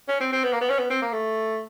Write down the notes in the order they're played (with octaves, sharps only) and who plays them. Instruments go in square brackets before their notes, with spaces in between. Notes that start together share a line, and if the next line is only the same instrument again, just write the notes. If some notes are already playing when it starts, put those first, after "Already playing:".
[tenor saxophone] C#4
C4
C4
B3
A#3
B3
C#4
B3
C4
A#3
A3